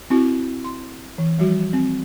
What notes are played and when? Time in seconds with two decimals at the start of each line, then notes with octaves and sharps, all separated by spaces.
0.10 C4 E4 F#4
0.64 C6
1.18 E3
1.39 F3 G3 F#4
1.73 C4